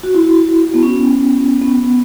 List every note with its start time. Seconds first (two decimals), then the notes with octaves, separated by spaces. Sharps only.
0.03 F#4
0.15 E4
0.24 F#4
0.74 B3
0.83 C#4
1.62 B3